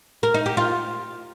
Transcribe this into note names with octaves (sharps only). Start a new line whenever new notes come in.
A#4
D#4
G4
F4